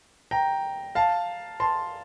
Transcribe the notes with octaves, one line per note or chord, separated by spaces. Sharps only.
G5 A#5
F5 A5
A5 C6